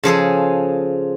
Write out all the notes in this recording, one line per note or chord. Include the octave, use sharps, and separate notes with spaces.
C#3 F3 G#4 A4